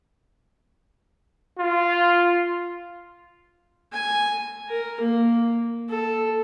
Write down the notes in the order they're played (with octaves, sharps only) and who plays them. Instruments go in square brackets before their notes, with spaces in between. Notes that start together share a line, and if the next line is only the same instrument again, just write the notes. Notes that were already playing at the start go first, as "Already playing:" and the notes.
[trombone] F4
[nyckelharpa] G#5
A#4
A#3
A4